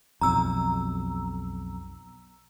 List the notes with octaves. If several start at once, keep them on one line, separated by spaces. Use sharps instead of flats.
B1 F2 A#5 E6